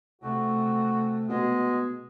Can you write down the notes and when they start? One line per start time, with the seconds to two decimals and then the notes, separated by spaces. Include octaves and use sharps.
0.22 C3 A3 F#4
1.29 B2 G#3